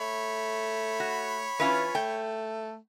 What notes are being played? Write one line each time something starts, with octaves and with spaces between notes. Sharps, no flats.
A3 C#5 B5
F#4
E3 C#4 F4 B4
A3 G5